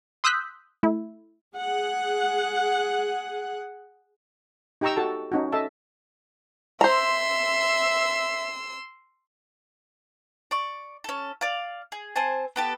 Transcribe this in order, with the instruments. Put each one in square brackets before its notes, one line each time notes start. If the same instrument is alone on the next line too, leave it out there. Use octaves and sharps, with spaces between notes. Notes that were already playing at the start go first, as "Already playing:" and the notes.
[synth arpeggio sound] C6 D#6 E6 F#6 G6 B6
A3 E4
[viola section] G#4 F#5
[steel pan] D#4 G4 G5 A#5 C#6 E6
F#4 A4 A5
C#4 D#4 F#4
A4 D#5 E5 A5
[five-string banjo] C5 A#5 [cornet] E5 [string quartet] C6 E6
[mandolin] D5 C#6
C#4 A4
D5 F5
G#4
C4 C5 G#5 A5
B3 G4 A4